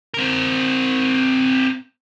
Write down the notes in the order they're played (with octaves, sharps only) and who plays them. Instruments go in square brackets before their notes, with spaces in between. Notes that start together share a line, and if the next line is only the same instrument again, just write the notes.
[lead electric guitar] C4 A#4